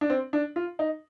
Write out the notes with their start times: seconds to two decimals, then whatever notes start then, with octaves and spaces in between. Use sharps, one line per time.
0.01 D4
0.10 C4
0.33 D4
0.56 F4
0.79 D#4